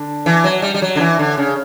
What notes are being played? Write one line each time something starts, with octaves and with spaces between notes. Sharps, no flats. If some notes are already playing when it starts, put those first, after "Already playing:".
Already playing: D3
E3
F#3
G3
G3
F#3
D3
E3
D3
C#3